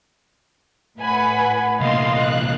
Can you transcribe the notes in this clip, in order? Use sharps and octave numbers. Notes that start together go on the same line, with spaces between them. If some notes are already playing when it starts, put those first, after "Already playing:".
A2 B4 F#5 G#5 B5
C2 A#2 D#5 F5 C6
F#6